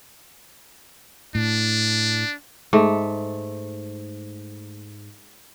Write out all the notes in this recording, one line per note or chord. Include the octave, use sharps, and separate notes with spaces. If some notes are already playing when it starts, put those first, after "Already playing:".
A2 D4
G#2 A3